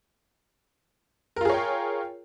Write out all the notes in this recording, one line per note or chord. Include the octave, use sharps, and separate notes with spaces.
F4 G#4 A#4 C#5 G5